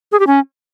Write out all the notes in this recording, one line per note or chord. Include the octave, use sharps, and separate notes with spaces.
G#4
G4
C#4